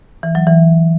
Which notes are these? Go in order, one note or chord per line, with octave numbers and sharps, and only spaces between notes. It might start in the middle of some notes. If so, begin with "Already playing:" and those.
E3
F#3
E3